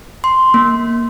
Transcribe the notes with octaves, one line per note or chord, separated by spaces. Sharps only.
C6
A#3